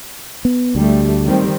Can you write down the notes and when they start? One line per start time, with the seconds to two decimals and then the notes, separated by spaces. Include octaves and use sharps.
0.45 B3
0.75 D2 G3 A3
1.26 D#3 G3 C4